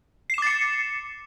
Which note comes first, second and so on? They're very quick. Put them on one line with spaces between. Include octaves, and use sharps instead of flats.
C7 E7 D6 A6 C#7